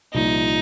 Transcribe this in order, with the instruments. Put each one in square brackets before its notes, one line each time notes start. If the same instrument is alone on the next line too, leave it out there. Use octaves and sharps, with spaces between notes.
[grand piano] C2 A#2 F3 [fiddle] D#4